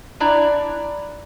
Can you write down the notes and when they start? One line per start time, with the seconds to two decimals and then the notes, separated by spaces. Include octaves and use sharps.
0.20 D4 E4 D5 A#5